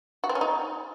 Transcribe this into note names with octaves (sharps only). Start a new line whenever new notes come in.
F#4
C4
C#4
D#4